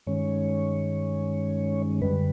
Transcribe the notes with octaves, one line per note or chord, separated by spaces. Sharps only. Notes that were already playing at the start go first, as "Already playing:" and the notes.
G2 D#3 G#3 C#4 C#5
F#2 D3 G3 B4